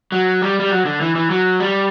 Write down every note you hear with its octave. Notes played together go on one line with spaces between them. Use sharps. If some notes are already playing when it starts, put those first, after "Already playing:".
F#3
G3
G3
F#3
D3
E3
E3
F#3
G3